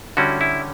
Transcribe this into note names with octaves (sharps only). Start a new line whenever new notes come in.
D3 G3 C#4 E4 F#4
E4